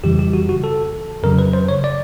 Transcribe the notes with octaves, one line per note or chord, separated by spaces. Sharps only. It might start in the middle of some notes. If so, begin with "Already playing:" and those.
F2 C#3 E3 G3 G4
G4
F#4
F#4
A4
F2 C#3 F#3 A#4
B4
C5
C#5
D5